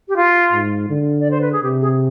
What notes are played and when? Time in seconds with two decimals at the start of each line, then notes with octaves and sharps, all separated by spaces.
0.08 G4
0.16 F4
0.52 G#2
0.90 D3
1.19 D5
1.31 C5
1.41 B4
1.52 G#4
1.63 C3 G4
1.81 G#4